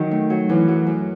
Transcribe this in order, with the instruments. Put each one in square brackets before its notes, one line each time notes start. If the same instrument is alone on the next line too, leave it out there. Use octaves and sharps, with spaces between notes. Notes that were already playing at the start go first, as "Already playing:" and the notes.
Already playing: [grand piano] D#3 [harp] F#3
[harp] A3
F#3
[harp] F#2 [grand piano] E3
[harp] F#3
F#2